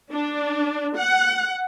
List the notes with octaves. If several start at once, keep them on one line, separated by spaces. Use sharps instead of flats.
D4
F#5